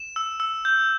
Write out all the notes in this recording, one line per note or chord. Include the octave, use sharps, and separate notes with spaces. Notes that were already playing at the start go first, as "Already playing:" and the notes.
Already playing: E7
E6
E6
G6